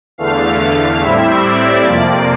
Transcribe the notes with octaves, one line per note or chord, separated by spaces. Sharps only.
E2 D3 A3 F5
A2 G3 C4 E4 E5
D5
F2 C3 F3 A#3